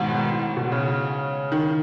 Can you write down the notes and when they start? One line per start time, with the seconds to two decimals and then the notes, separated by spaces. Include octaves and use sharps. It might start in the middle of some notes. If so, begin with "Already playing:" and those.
Already playing: G#2 B2 D#3
0.09 A2
0.57 B2
0.72 C#3
1.52 D#3